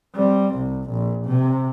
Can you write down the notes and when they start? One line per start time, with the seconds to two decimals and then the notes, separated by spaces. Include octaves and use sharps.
0.15 G3 C4
0.55 C2
0.90 A#1
1.25 C3